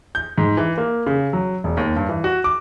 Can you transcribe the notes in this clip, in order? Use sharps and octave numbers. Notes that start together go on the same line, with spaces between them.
G6
G#2
E3
A#3
C#3
F#3
E1
D#2
G2
E3
F#4
D6